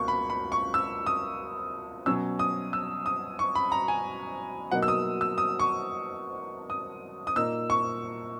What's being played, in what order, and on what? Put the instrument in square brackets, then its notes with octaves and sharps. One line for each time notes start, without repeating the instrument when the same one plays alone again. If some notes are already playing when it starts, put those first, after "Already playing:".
Already playing: [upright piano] C#2 B2 A#3 C#6
B5
B5
C#6
E6
D#6
B2 F#3 C#4 E6
D#6
E6
D#6
C#6
B5
A#5
G#5
B2 F#3 A#3 D#4 F#5
E6
D#6
E6
D#6
C#6
D#6
D#6
A#2 A#3 D#4 E6
C#6